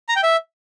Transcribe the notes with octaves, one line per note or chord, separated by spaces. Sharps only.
A#5
G5
E5